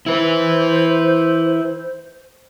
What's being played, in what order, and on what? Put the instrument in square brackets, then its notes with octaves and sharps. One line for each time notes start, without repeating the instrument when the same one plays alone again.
[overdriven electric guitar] E4 B4 [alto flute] C5